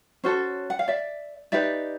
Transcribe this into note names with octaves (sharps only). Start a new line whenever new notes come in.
C#4 F#4 A4 C5
F#5
F5
D5 E5
D#4 G4 B4 D5 E5